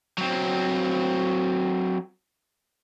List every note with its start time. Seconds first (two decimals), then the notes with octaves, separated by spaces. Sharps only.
0.18 F#3 C4